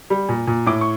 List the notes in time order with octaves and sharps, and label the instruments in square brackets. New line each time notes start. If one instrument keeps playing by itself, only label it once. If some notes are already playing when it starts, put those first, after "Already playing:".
[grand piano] G3
A#2
A#2
A2 D6
C#6